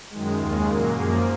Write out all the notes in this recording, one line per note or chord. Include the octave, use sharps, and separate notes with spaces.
F#2 D#3 G#3
D#2 C#3 G#3 F4
A#2 F#3 A#3
F#2 F3 A#3 G#4